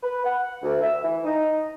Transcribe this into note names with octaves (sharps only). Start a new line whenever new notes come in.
B4
F#5
D2
E5
E3
D#4